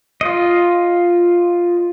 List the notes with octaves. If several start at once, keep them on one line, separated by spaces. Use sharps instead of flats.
F4 D#5